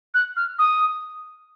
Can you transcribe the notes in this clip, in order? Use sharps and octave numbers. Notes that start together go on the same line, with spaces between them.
F#6
F6
D#6